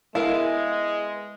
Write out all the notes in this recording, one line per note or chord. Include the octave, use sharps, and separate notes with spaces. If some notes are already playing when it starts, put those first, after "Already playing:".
G#3 B3 E4 A#4 F5